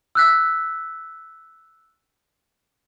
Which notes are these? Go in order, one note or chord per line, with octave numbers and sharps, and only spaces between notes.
E6 F#6 B6